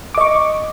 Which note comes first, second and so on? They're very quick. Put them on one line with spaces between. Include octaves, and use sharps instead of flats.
D6 D#5 C#6